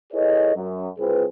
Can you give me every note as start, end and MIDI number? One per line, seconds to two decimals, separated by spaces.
0.13 0.52 64
0.13 0.52 68
0.13 0.52 69
0.13 0.52 71
0.13 0.52 73
0.13 0.52 75
0.56 0.89 42
0.99 1.25 36
0.99 1.25 60
0.99 1.25 65
0.99 1.25 68
0.99 1.25 71